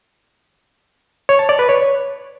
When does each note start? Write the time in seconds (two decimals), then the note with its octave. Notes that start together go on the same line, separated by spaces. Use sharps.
1.29 C#5
1.39 A5
1.49 D5
1.59 B4
1.69 C#5